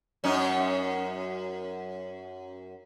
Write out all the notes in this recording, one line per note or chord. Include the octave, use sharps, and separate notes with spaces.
F#2 C#4 D#4